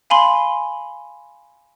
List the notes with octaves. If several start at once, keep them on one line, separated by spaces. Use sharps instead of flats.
F5 G#5 B5 C6